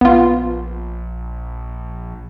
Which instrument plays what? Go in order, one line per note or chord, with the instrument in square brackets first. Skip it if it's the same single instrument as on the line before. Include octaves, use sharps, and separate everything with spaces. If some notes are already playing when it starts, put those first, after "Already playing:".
[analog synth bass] A#1 [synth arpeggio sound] B3 F4